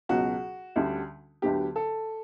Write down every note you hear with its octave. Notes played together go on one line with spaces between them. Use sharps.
C#2 B2 F#3 F#4
D2 D3 G3 C#4
D2 D3 F#3 B3 G4
A4